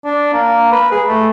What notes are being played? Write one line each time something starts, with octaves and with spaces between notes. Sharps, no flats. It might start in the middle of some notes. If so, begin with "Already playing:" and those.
D4
A#3
B4
G#4
A3